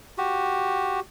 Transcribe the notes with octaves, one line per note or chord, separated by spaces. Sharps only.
F#4 G4